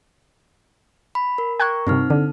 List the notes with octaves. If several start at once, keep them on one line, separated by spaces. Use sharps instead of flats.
B5
A#4
A#4 G5 A#5 C#6 F#6 G#6
G2 C3 C4 D#4 F6
D3 A4